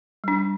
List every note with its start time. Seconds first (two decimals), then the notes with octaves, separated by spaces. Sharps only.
0.24 G3 D4